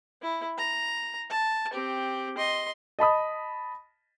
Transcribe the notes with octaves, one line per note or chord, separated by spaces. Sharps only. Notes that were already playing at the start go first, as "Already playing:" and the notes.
E4
A#5
A5
C4 G4
D#5 C6
D#5 A5 B5 D#6